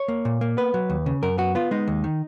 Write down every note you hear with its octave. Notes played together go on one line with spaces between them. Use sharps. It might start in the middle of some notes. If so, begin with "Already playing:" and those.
Already playing: C#5
A#3
A#2
A#3
B3 B4
F#3
D#2
C#3
F#2 A#4
B3 F#4
B3 F4
G#3 D#4
D#2
D#3